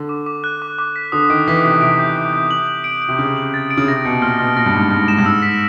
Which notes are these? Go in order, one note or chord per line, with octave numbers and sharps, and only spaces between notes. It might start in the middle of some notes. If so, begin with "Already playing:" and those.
Already playing: D3
D6
D6
F#6
D6
D6
B6
D3 D#6
D#3 D7
E3 B6
C3 B6
C3 D7
G6
B6
G6
F#7
F#7
D7
D7
C3
C#3 D7
F#7
A6
D7
C#3
C3 A#6
B2 C#7
A#2 F6
B2 F6
A#2 A#6
G2
G#2 C#7
G#2 F6
G#2 E7
G2
G#2 E6
B6